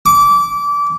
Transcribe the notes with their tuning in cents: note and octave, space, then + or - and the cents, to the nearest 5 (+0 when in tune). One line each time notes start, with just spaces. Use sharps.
D6 -25